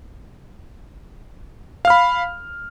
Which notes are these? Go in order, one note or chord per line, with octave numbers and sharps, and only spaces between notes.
F5 B5 F6